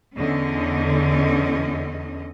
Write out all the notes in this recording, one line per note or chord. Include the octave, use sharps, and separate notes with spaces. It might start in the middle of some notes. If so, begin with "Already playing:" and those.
E2 D3 C#4 D#5